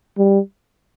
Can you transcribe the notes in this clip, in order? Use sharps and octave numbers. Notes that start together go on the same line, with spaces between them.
G3